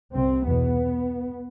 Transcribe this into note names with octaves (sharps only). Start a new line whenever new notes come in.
C2 C3 C4
E2 B2 B3